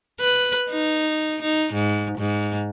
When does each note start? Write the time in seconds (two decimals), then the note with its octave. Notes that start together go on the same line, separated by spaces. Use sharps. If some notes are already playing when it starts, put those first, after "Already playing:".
0.20 B4
0.69 D#4
1.42 D#4
1.73 G#2
2.18 G#2